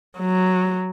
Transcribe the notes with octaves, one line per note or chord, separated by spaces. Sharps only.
F#3